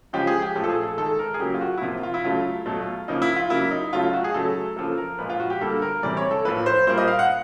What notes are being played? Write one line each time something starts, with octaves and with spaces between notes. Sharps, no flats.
C#3 F3 G#3 G4
G#4
G4
A#2 F3 A3
A4
G#4
A4
D#3 G#3 A4
A#4
G#4
C#3 F#3 A#3 G4
F4
F#4
E4
C3 F3 A#3 F4
F4
E4
C#3 F#3 A3 F4
B2 F#3 A3
C#3 F3 A#3 D#4
E4
F4
C#3 F#3 A#3 E4
D#4
C#3 F#3 A3 F4
F4
F#4
G#4
C#3 F#3 A3 A4
C#3 F3 A#3 A4
A#4
A#2 F3 G#3 B4
F4
F#4
G4
D3 G3 A#3 A4
A#4
C3 E3 G3 D5
C#5
A4
A2 F3 A#3 B4
C5
A#2 G3 A#3 C5
D#5
F5
F#5